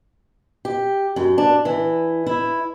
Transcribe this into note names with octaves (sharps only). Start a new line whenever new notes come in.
G4
F#2
D4
E3
E4